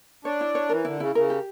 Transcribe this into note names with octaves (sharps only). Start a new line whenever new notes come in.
D4 C#5
E4
C#5
E3 A#4
D3 E4
C#3 E4
C#3 A#4
G4